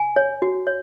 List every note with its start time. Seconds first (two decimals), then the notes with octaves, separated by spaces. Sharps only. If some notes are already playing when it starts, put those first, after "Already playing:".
Already playing: G#5
0.16 C#5
0.42 F#4
0.67 C#5